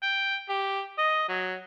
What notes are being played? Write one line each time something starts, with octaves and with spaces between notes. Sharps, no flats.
G5
G4
D#5
F#3